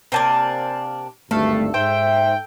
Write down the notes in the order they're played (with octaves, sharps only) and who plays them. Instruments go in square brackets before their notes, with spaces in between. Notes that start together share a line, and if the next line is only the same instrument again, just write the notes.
[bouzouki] C3 A#3 D4 [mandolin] C5 G#5 A5
[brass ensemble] G#1 D2 G2 [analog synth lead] A3 [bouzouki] A4 [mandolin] F5
[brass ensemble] G#2 E5 [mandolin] C5 [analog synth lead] G5